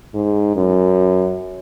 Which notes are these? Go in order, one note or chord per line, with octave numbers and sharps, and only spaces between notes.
G#2
F#2